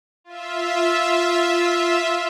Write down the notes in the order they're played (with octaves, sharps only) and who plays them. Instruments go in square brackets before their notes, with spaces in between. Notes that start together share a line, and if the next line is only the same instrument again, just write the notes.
[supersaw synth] F4 E5